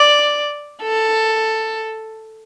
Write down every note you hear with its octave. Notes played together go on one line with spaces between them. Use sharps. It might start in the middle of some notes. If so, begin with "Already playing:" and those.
Already playing: D5
A4